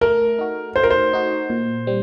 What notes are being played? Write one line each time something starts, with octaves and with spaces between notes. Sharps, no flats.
A3 A#4
D#4 F#4
A3 C5
A#4
C5
D#4 F#4
A#2
G3 C4